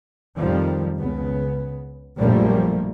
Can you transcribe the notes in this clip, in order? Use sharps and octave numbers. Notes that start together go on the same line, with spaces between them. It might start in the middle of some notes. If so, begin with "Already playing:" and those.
F2 D#3 F3 G3
C#2 C#3 B3
A#1 F#2 F3 G3 A3 A#3